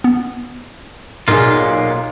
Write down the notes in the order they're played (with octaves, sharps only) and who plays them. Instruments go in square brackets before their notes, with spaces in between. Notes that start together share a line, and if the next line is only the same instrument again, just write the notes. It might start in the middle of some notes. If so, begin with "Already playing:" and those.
[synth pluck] B3
[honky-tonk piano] B1 G#4 [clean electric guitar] A#2 A#3 F4